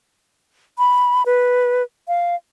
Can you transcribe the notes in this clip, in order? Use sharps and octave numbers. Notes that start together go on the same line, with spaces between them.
B5
B4
F5